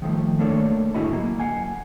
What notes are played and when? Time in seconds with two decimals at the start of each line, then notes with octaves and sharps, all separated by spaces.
0.02 D#3 F3 A3
0.39 A3 A#3 D4 A4 C#5
0.94 G#2 D3 E4 F#4 D#5 B5
1.13 F#3 A#3
1.40 F5 F#5 G#5